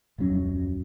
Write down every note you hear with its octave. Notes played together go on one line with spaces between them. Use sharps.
D1 F2 F#3 C#4